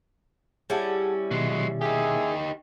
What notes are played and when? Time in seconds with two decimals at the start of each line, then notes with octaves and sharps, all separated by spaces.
0.70 G3 C#4 E4 G#4 F#5 A5
1.31 B2 D#3 F#3 G#3
1.81 D#4 G4 G#4 E5